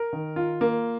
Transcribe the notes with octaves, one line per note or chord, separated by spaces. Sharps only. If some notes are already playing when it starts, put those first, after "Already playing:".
Already playing: A#4
D#3
F4
A#3